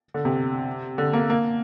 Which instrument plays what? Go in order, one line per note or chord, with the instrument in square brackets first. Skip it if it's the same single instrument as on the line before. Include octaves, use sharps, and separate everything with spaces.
[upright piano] D3
C3
D3
A#3
A#3